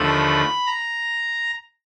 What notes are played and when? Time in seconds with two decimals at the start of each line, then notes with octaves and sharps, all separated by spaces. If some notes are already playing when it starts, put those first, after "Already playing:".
Already playing: D#2 D3 F3 A3 B5
0.67 A#5